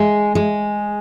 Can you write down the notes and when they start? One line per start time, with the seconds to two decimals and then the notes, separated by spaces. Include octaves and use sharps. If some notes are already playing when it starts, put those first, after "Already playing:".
Already playing: G#3
0.35 G#3